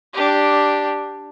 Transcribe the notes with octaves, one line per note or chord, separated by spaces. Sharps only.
D4 G4